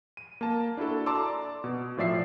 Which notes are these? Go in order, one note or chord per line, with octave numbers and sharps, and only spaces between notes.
D#7
A#3 A5
D4 E4 F#4 A4
D5 A5 A#5 C6 D6 E6
B2
A2 F3 D5 E5 C7